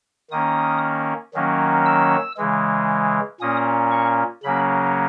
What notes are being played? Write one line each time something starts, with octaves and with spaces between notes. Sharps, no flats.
D#3 A#3 C#4 D#6
D#3 F#3 A#3 C#4
E6
C#3 E3 G#3
A#2 A#3 C#4 D#6
C#6
C#3 F#3 A#3 C#4 B5